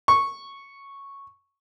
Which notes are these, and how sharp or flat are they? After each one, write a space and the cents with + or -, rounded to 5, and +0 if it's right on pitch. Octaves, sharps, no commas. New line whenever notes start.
C#6 -5